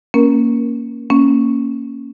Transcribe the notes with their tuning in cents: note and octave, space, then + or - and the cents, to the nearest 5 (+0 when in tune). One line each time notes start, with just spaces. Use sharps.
A#3 +0 C#4 +0 A#4 +25
A#3 +0 C#4 +0